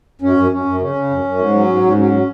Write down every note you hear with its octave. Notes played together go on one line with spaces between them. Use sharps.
F#2 C#4
F#2
F#2 C#4
F#2
C#3 C#4
C#3
F#2
F#2
G#2
F#3
G#2
G#2
F#3 C#4
F#3